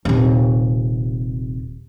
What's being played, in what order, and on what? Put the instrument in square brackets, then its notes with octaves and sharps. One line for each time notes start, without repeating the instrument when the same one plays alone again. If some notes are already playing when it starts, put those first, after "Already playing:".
[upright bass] D#1 C3